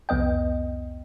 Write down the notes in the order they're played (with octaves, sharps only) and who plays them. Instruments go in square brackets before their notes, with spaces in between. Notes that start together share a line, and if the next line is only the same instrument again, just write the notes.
[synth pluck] C2 F2 B3 D#5 G5